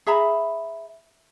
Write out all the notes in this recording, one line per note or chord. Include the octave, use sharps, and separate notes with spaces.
G#4 E5 A#5 B5